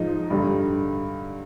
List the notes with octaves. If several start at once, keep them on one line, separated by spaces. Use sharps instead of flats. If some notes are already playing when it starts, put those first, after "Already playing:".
Already playing: G#2 F3 D#4
G2 D3 G3